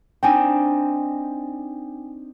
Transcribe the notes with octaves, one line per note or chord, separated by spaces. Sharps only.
C4 D4 D#4 G5 G#5